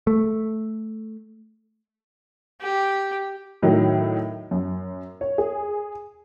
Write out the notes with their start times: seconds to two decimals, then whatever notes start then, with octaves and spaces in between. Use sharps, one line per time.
0.07 A3
2.61 G4
3.62 A2 D#3 F#3
4.51 F#2
5.21 C#5
5.38 G#4